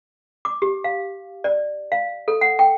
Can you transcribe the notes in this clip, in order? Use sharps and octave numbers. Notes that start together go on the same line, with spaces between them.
D6
G4
F5
D5
F5
A4
F#5
G5